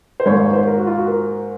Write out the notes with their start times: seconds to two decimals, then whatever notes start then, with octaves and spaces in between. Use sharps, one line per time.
0.20 C5
0.26 G#2 D#3 A#3 C#5
0.40 C#5
0.53 C5
0.67 A#4
0.77 F#4
0.87 F4
0.98 F#4
1.08 A#4